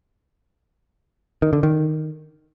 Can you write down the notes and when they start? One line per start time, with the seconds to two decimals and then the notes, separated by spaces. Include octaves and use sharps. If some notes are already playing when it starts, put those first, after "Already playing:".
1.42 D#3
1.53 D3
1.63 D#3